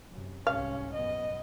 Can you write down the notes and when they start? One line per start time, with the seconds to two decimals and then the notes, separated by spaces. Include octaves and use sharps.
0.12 F#2 C3
0.47 C2 G#2 C3 C#4 F5
0.94 B1 F#2 B3 D#5